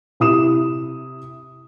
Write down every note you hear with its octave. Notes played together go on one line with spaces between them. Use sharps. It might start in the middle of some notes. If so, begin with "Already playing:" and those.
C3 E4 D#6 E7